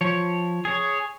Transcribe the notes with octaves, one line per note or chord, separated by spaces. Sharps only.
F3 C#5
G#4 C#5